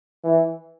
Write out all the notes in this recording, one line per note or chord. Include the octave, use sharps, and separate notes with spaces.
E3